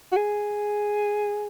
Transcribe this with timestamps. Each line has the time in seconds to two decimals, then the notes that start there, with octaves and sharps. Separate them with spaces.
0.12 F#4
0.16 G#4